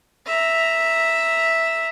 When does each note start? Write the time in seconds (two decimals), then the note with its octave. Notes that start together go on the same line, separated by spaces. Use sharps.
0.26 E5 A#5